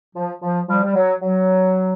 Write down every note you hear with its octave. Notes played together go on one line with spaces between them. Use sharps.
F3
F3
F3 G3
G3
F#3
F#3